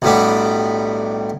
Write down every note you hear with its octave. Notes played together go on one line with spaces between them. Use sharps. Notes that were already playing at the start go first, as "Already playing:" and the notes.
B1 A2 G3 B3 D4